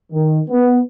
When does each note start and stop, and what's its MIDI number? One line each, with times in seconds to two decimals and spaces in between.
0.12 0.40 51
0.49 0.79 59